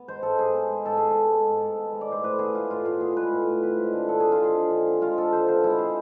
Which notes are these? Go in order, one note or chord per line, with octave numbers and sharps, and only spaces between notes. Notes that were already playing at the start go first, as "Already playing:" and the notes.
Already playing: B3
G#3 C5
G#2 A4
G#2 G#4
B3
G#3
G#2 A4
G#2 G#4
B3 A4
G#3
G#2
G#2
B3
G#3
D5
A2 C5
A2 B4
B3 G#4
G#3 F4
A2 F4
A2 F4
B3 G#4
G#3 B4
A2
A2
C4 B4
G#3
D3
D3 A4
G#4
C4
F4
G#3 G#4
D3
D3
C4
G#3 F4
D3 A4
D3 C5
B3 C5
G#3 E4
C3 G#4